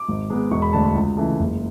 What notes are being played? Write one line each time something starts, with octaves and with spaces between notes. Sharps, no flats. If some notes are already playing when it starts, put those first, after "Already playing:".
Already playing: D6
G#1
G#2 G#3 B3
E1 C#6
B5
D2 D3 A3 A5
B5
C#2
C#3 E3 A3
F#1